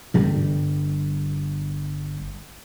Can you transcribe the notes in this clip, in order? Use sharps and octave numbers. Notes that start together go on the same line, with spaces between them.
G1 G3